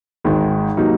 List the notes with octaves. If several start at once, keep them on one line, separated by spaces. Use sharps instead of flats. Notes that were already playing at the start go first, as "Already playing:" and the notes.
G#1 G#2 D#3 G#3 D#4
C3 F#3 A#3 D#4